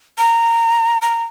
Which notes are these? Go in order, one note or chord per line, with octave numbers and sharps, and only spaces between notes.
A#5
A#5